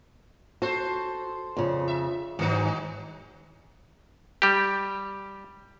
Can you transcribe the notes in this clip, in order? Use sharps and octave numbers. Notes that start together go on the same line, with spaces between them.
F#4 A4 C5
F2 C#3
E5
G#2 D#3 F#3 C#4 D#4
G3 G4